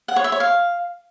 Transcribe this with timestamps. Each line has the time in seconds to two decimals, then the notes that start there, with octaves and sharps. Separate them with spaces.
0.08 F#5
0.16 C#5
0.24 E5
0.32 C#5
0.40 F5